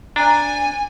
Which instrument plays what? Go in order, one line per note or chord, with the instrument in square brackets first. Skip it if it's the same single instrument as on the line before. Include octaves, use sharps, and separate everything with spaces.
[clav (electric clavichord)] D4 [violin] G#5 [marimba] A#5